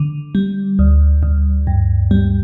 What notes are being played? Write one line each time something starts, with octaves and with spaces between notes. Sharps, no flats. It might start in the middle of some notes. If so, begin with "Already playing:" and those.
Already playing: D3
G3
D2
D2
G2
G3